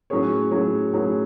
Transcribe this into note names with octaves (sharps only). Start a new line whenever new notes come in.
A2 F#3 C#4 G#4 C#5
A2 F#3 C#4 G#4 C#5
A2 F#3 C#4 G#4 C#5